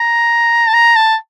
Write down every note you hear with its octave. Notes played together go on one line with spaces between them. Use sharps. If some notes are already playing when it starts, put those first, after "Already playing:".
Already playing: A#5
A5
A#5
A5